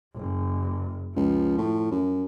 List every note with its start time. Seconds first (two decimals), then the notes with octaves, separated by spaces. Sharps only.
0.15 F#1
1.16 C#2 F3
1.58 A2
1.91 F#2